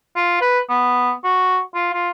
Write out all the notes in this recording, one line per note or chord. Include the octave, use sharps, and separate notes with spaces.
F4
B4
B3
F#4
F4
F4